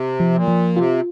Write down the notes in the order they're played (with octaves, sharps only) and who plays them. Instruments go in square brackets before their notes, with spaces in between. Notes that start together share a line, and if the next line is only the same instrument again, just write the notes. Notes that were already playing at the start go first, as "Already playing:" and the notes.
Already playing: [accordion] C3
[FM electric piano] F3
[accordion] A#2
[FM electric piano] F3
[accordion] C3 [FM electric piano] F4